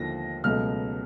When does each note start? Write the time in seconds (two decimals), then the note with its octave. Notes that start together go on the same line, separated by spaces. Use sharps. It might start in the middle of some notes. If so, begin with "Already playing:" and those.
Already playing: D#2 D3 F3 A#6
0.44 C#2 B2 F#3 A3 F6